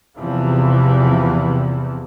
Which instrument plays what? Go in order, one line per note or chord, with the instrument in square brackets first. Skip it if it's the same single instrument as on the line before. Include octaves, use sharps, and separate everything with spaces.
[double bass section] E2 C3 E3 F3